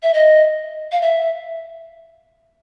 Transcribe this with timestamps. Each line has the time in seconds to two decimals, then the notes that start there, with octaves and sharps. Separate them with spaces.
0.03 E5
0.14 D#5
0.92 F5
1.02 E5